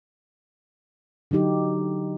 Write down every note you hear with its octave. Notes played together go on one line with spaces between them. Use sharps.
D3 F#3 D#4 G4